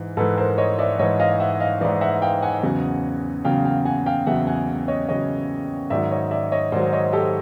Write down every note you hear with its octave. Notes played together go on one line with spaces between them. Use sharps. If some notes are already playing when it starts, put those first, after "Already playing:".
Already playing: G#2 E3
G#2 E3 A4 B4
A#4 C5
C#5 D#5
D5 E5
G#2 E3 C#5 D#5
D#5 F5
E5 F#5
D#5 F5
G#2 E3 D5 E5
E5 F#5
F5 G5
F#5 G#5
E2 C#3 F#3
E2 C#3 F#3 F5 G5
F5 G5
F#5 G#5
F5 G5
E2 C#3 F#3 E5 F#5
F#5 G#5
C#5 D#5
E2 C#3 F#3 C#5 D#5
G#2 D#3 F#3 D5 E5
C#5 D#5
D5 E5
C#5 D#5
G#2 D#3 F#3 C5 D5
C#5 D#5
G4 A4